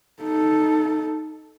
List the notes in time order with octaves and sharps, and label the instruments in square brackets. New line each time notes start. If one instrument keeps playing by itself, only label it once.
[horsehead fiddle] D#4 A4